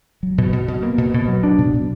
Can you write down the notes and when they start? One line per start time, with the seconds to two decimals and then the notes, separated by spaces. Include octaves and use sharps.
0.23 F#3
0.38 B2
0.53 B2
0.68 B2
0.83 A#3
0.98 B2
1.14 B2
1.28 F#3
1.43 D4
1.58 B2
1.73 B2